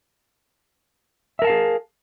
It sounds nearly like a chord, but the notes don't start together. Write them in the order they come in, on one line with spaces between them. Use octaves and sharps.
E5 A#4 A5 F5 G#4